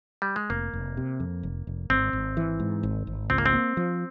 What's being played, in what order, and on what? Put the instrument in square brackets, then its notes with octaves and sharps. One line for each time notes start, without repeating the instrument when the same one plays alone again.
[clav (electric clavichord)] G3
G#3
[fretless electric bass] F1 [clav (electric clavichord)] A#3
[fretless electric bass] F1
C3
F2
F1
F1
[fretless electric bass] G#1 [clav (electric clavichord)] C4
[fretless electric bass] G#1
E3
G#2
G#1
G#1
[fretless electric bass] C#2 [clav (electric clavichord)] C4
[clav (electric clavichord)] A#3
C4
[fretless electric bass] A#3
F3